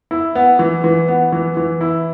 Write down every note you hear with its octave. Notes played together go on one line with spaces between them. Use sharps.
E4
B3
E3
E3
B3
E3
E3
E4